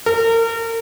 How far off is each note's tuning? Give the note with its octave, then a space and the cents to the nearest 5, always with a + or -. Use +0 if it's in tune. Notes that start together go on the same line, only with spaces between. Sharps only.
A#4 -35